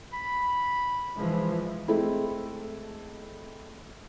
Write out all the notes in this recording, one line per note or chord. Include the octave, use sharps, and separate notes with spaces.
B5
E3 F3 G#3
G#3 A3 C4 E4 A4